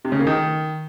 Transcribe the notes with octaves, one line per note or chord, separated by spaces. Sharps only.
C3
C#3
A#3
D#3